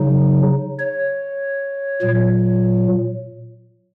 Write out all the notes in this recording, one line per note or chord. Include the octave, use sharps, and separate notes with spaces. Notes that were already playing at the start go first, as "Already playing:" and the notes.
Already playing: C#3 F#3 D#4
C#5
A#2 F#3